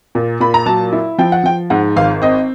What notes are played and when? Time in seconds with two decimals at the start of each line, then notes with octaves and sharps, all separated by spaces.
0.15 A#2
0.40 A#2 B5
0.54 A#5
0.66 F#3 A5
0.93 E4
1.18 F3 G5
1.32 F#5
1.44 F3 G5
1.70 G#2 F#5
1.96 G#1 F5
2.22 C4 D#5